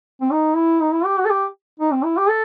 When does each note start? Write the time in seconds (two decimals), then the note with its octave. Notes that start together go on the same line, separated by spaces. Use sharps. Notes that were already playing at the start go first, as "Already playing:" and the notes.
0.21 C4
0.31 D#4
0.55 E4
0.81 D#4
0.93 E4
1.05 G4
1.18 F#4
1.25 A4
1.30 G4
1.80 D#4
1.92 C4
2.04 E4
2.17 G4
2.29 A4